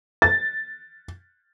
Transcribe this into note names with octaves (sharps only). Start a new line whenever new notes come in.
A6